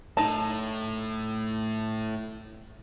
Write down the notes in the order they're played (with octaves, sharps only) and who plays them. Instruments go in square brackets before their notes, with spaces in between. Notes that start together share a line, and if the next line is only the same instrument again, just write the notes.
[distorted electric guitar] A2 [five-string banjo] D#4 A5